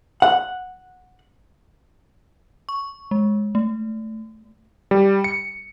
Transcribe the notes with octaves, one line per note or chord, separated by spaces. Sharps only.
F#5
C#6
G#3
A3
G3
C#7